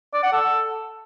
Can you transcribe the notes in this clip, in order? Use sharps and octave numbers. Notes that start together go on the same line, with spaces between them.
D5
F#5
A4